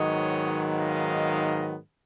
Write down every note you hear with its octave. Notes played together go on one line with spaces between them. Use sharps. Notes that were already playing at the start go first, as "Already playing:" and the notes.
Already playing: G#2 D#3 F#3 B3 C#5 D#5
D#5 F5